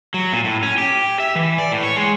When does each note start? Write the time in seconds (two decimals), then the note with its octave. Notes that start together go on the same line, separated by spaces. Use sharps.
0.14 F#3
0.33 A#2
0.44 A2
0.63 C#4
0.78 G4
1.20 E5
1.35 E3
1.58 D5
1.72 A2
1.84 C#5
1.96 G#3